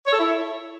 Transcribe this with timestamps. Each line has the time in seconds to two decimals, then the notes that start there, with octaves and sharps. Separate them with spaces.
0.07 C#5
0.13 A4
0.19 E4